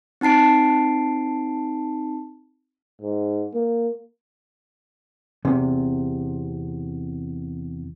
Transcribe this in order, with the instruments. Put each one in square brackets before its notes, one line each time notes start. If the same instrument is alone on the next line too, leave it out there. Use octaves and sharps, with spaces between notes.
[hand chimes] C4 D#4 A5 C7 D7
[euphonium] G#2
A#3
[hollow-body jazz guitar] E2 C3